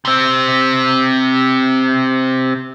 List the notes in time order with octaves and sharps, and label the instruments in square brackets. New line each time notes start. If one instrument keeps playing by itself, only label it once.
[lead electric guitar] C3 C4